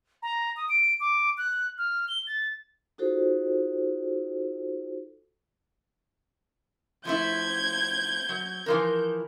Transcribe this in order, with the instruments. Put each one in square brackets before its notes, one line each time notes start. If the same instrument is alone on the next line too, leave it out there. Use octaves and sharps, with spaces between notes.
[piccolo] A#5
D#6
D7
D6
F#6
F6
G7
A6
[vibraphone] D#4 F4 F#4 G#4 A4 C5
[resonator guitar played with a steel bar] F3 A3 E4 [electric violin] G6 [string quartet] G#6
[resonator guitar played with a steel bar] F#3
E3 F3 A#4